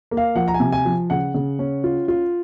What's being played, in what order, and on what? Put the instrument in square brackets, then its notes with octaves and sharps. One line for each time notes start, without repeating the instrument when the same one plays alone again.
[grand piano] A#3
F5
F3 F#5
A#5
G#5
C3
G#5
F3
C#3 F#5
C#3
C#4
F4
F4